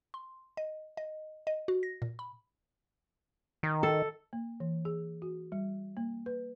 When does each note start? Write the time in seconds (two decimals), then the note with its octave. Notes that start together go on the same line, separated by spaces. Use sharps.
0.14 C6
0.57 D#5
0.97 D#5
1.47 D#5
1.68 F#4
1.83 A#6
2.02 A#2
2.19 B5
3.63 D#3
3.83 A4
4.33 A#3
4.60 E3
4.85 G#4
5.22 F#4
5.52 G3
5.97 A#3
6.26 B4